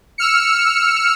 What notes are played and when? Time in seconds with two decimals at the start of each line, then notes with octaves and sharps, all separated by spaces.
0.18 E6 F6 C#7